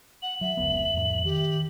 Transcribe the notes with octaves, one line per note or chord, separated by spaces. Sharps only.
F#5 F#7
F#3 E5
F1 C#2 B3
F2 A2
D#3 G4